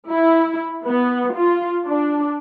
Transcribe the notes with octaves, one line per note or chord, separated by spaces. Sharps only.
E4
B3
F4
D4